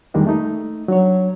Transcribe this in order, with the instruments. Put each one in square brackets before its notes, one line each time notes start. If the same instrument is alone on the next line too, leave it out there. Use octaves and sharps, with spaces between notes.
[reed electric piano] F2 D#3 G3 G#3 A#3 D4
A3 D#4
F#3 D4 C#5